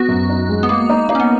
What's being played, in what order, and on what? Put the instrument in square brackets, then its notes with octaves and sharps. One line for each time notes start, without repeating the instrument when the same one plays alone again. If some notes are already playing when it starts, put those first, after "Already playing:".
Already playing: [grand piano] B3 [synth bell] F#4
[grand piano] F#2
D#4
G#3
[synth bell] B3
[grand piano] G#3 [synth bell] A#3
[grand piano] D#4
[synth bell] A#3 [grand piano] D#4
[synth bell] C#4
B3